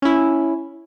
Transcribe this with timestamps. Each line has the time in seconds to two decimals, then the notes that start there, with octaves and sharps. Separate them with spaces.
0.02 C#4 E4